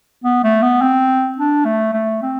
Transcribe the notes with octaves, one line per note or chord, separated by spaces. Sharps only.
B3
A3
B3
C4
D4
A3
A3
C4